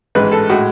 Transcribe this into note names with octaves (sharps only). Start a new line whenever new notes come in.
A1 G#2 G#3 B4
A4
A2 G#3 F#4